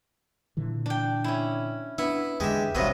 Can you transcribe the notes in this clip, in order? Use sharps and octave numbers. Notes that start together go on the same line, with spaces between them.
A#2 D3 E3
D4 G5
C#4 E4
B3 D4 E4
E2 D3 G#3 G4 E5
G#1 C#2 G2 C3 F#3 B4 D#5